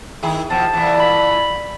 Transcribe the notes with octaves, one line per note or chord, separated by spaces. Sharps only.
D#3 E4 G#4
B2 F3 A5
A#2 E3
B5